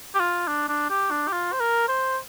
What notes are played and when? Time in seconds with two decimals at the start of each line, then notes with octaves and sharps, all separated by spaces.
0.15 G4
0.20 F4
0.48 D4
0.69 D4
0.90 G4
1.11 D4
1.28 G4
1.33 F4
1.52 C5
1.60 A#4
1.88 C5